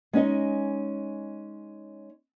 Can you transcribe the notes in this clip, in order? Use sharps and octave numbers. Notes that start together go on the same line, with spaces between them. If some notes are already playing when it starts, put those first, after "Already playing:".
G#3 C#4 D#4 D#5